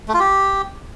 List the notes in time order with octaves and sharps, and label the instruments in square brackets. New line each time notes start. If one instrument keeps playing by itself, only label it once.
[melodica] A3
F4
G4